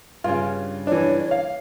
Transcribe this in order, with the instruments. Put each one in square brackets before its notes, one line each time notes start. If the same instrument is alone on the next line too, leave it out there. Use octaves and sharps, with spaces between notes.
[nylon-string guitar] G2 C#3 [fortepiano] F4
[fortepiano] E3 D4 [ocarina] C#5
[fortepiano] F5